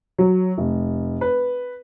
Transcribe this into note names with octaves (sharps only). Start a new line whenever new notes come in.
F#3
F1
B4